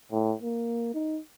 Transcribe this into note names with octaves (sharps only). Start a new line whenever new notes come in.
A2
A#3
D#4